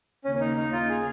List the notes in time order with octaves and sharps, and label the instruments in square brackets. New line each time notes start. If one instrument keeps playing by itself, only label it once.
[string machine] D#2 C#3 A#3 [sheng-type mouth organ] C#4
[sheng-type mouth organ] C#4
D#4
D#4
F4
G#4